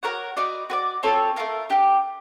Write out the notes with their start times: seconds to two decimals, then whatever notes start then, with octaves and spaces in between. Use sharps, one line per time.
0.03 F#4 A#4 C#5 F#5
0.37 D#4 F#4 B4 D5
0.70 F#4 B4 D5
1.03 C4 F4 A4 C#5
1.36 A3 C#4 F4 A#4
1.70 D4 G4 A#4